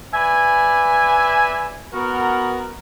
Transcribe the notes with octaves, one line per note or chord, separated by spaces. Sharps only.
B4 D5 E5 G#5
B3 F#4 A#4